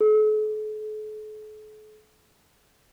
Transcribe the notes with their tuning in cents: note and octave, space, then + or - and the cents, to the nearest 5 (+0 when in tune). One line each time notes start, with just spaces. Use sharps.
A4 -45